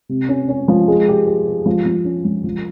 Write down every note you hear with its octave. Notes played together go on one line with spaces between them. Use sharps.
C3
C#4
C#4
F3
G#3
G4
G4
G4
F3
F3
C#4
F3
F3